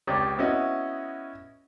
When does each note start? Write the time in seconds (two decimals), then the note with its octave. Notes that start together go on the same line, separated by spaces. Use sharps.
0.07 C#2 G4 C#5 D5 D#6
0.38 B3 C#4 E4 F#4 D#5